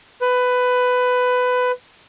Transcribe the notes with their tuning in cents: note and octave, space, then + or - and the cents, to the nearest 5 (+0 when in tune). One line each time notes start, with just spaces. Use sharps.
B4 +15